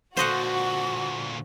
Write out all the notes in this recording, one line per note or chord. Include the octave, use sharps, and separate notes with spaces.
A#2 D3 F#4 C5 D#5 F#5 C#6